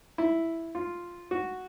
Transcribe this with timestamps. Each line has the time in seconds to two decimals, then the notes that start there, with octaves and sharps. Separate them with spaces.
0.18 E4
0.75 F4
1.31 F#4